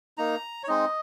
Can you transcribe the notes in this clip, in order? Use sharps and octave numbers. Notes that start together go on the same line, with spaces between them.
A#3 D#4 A#5
C#5
G#3 C4 D#4 D#5